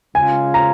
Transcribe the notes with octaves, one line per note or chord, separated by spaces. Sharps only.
C#3 G#3 C#4 F4 G#5
A#5